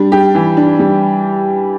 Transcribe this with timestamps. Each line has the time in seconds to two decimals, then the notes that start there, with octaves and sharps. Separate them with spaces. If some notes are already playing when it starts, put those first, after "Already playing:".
Already playing: G3 D4
0.12 G4
0.35 E3
0.57 D4
0.79 G3